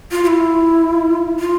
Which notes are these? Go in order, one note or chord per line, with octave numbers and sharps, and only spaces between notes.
F4
F4
E4
F4